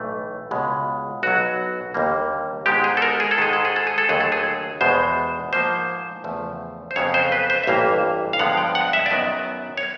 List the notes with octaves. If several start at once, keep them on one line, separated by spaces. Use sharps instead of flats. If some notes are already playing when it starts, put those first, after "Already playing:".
Already playing: B1 A2 E3 A3
C#2 B2 G#3 B3
B1 B2 F#3 F#4
D#2 D3 G3 A#3
G#2 D#3 G#3 B3 G4
G#4
A4
A#4
G#4
A4
G#2 D#3 G#3 G#4
A4
G#4
A4
G#4
A4
D#2 D3 F#3 A3 G#4
A4
G#4
E2 B2 G#3 B3 C5
G#2 F3 A#3 C5
E2 C#3 F3 A3
C5
F2 C#3 F#3 B3 C#5
C5
B4
C5
E5
A1 G2 E3 G3 A#3 F5
F5
G2 D3 F3 G#3 B3 F#5
G5
F#5
E5
D5
F#2 D#3 F#3 B3 D#5
C#5